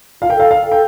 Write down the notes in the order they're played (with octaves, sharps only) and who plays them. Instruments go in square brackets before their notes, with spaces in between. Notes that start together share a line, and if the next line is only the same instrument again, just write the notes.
[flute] F4 [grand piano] F5
[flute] A#4 [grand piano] G5
[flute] A4 [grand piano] F5
[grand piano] F5
[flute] A4
[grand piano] G5